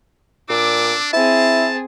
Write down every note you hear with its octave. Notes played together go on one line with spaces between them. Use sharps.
A#2 D4 D6 E6
C4 E4 G#4 A5